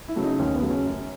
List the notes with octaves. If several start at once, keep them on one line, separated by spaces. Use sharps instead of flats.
E4
C#3 F#3 A3
D#4
D#2 C#4
B3
C#3 F#3 A3
C#4
F#2